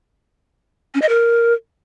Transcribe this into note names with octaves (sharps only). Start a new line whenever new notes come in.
C#4
D#5
A#4